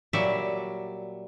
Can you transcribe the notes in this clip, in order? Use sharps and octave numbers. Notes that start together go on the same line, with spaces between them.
A#2 F#3 G3 D5 E5